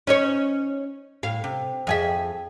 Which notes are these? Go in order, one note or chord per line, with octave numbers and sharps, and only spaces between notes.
C#4 D#4 C#5
A2 F5
C3
F2 G#4 E5